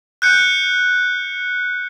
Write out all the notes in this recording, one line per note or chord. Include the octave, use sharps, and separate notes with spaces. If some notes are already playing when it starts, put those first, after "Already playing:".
F#6 G6 C#7